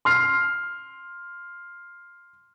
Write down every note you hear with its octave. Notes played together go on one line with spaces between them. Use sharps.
C6 F6 C7